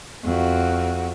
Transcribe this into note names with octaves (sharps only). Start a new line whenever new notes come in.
F2 F#4